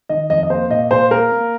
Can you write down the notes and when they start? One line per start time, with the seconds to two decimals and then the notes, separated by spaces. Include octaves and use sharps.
0.09 D#3 D#5
0.30 F2 D#5
0.43 D#5
0.50 A#3 C5
0.70 A#2 D#5
0.91 A#2 C5
1.11 A#3 A#4
1.32 A#3